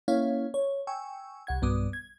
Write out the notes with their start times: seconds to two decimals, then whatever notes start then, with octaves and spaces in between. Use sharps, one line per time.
0.08 A#3 C#4 E4 C#5 F5
0.54 C#5
0.87 G5 G#5 C#6 E6
1.47 C2 F#5 G#6
1.62 B1 G2 B3 D6 D#6
1.93 G#6